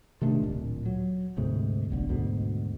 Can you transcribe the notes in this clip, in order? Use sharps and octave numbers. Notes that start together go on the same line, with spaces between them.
C3 D#3 A3 D4
D1 B1 A#2
F#3
D2 G#2 C3
F1 B1 D3
D2 G#2 B2